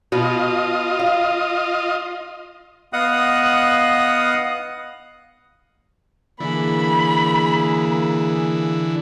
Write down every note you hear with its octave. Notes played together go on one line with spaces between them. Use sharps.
B2 F4 F#4 D#5
F5
B3 D#5 F5 F#5 D#6 F#6
D3 E3 A#3 G#4 B5